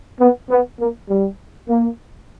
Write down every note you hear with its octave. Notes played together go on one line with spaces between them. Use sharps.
B3
B3
A#3
G3
A#3